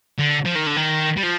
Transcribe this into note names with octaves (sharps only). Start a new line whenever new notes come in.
D3
F3
D#3
D3
D#3
G3
F3